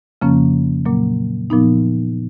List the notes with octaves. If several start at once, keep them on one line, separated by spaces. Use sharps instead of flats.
F2 C#3 F3 A#3 C#4
A#2 F#3 A#3
A#2 F3 B3 D#4